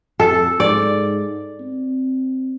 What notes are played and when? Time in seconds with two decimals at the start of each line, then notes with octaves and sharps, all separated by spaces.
0.20 F2 A4
0.60 G#2 D5
1.60 C4